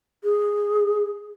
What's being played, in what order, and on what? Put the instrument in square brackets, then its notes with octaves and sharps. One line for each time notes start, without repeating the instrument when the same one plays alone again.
[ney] G#4